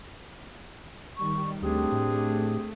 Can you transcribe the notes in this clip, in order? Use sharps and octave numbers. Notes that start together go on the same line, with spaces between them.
D#3 G3 C#6
D2 A3 C4 D4 G4 G#4
A2